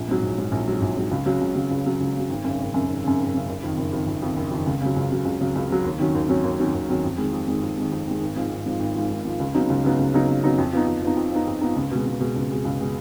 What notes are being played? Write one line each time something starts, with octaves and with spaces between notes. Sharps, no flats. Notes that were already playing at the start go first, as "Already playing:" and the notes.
Already playing: A#1
G#2 F#3
A#1
G#2 F#3
A#1
G#2 F#3
A#1
G#2 F#3
C#2
C#3 F#3
C#2
C#3 F#3
C#2
C#3 F#3
C#2
C#3 F#3
G#1
F#2 C#3
G#1
F#2 C#3
G#1
F#2 C#3
G#1
F#2 C#3
F#1
F2 D#3
F#1
F2 D#3
F#1
F2 D#3
F#1
F2 D#3
C#2
C#3 F#3
C#2
C#3 F#3
C#2
C#3 F#3
C#2
C#3 F#3
D#2
D#3 F#3 C#4
D#2
D#3 F#3 C#4
D#2
D#3 F#3 C#4
D#2
D#3 F#3 C#4
F2
D#3 G#3
F2
D#3 G#3
F2
D#3 G#3
F2
D#3 G#3
G#1
G#2 F3
G#1
G#2 F3
G#1
G#2 F3
G#1
G#2 F3
C#2
C#3 F#3 B3 D#4
C#2
C#3 F#3 B3 D#4
C#2
C#3 F#3 B3 D#4
C#2
C#3 F#3 B3 D#4
F2
F3 B3 D#4
F2
F3 B3 D#4
F2
F3 B3 D#4
F2
F3 B3 D#4
C#2
B2 G#3
C#2
B2 G#3
C#2
B2 G#3
C#2
B2 G#3